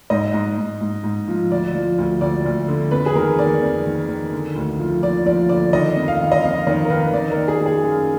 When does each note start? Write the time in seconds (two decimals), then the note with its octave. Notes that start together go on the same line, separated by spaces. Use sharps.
0.10 G#2 D#5
0.34 G#2
0.58 G#2
0.81 G#2
1.04 G#2
1.28 F3
1.51 D2 D5
1.75 F3
1.98 D2
2.21 D2 D5
2.45 D2
2.68 D3
2.91 F2 B4
3.06 G#4
3.15 D#3 A#4
3.39 D#3 D5
3.62 F2
3.86 D#3
4.08 D#3
4.32 D3
4.56 D2
4.79 F3
5.02 F3 D5
5.26 F3 D5
5.49 D3 D5
5.73 D#3 D#5
5.96 F2
6.08 F5
6.20 D#3
6.32 D#5
6.43 F2 F5
6.67 D#3 D#5
6.85 A#4
6.90 D#3 B4
7.13 D#3 D5
7.31 A#4
7.36 D#3
7.48 G#4
7.61 D#3 G#4
7.84 F#2